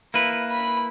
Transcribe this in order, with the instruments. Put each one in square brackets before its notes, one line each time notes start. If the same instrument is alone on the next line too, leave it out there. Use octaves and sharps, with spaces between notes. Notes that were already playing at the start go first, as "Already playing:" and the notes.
[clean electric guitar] A#3 E4 B4
[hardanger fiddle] B5